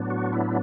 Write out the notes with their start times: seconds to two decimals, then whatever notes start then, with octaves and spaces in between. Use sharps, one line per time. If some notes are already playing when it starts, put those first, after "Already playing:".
Already playing: A2 F#3 B3 D4
0.10 F#4
0.33 E4